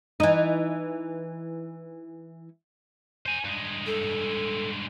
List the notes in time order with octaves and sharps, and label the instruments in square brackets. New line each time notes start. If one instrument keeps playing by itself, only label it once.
[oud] E3 D#4
[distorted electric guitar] C5 G#5
G2 G#3
[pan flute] A4